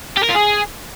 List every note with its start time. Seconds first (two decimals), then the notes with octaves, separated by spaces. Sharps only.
0.17 G4
0.24 A#4
0.30 F4
0.36 G#4